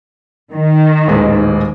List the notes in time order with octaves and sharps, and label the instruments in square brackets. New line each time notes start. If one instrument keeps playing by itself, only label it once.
[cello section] D#3
[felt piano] D#1 A1 G#3